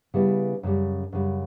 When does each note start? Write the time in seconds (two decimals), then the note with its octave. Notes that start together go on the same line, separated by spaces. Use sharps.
0.14 C#3 G3 B3 E4
0.63 F#2 C#3 G3
1.13 F#2 C#3 G3